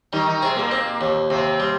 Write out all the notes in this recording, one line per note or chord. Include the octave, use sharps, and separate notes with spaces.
D#3 G3 D#4
D#3 D#4
C3 C4 G#4
A#2 A#3
C4
D#2
D#2 C3 C4
G3